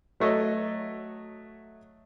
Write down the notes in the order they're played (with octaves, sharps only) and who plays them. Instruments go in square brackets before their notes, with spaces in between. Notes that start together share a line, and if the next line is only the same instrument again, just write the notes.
[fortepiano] F#3 A3 C#5 D#5